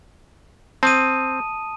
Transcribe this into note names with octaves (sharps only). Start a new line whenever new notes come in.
C4 A5 D#6 D#7